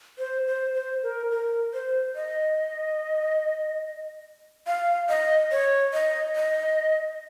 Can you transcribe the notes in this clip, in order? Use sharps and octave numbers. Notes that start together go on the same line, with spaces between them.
C5
C5
C5
A#4
A#4
C5
D#5
F5
D#5
C#5
D#5
D#5